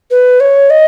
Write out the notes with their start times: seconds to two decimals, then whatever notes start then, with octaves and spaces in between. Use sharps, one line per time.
0.11 B4
0.40 C#5
0.70 D#5